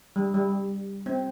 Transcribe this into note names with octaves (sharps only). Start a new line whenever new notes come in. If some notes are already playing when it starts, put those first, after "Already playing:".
G3
G3
C4